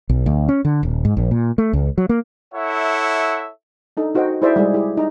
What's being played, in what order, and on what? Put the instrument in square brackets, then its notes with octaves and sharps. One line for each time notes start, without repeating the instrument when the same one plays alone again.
[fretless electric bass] B1
D2
C#4
D3
D#1
G#2
A#1
A#2
A3
C#2
F#3
A#3
[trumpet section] E4 A4 C#5 E5 F#5
[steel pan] D4 D#4 A4
D#4 F#4 C5 D#5 G5
E4 G#4 C5 D5 E5
G3 G#3 G#4
E4 G4 G#4
D#4 A#5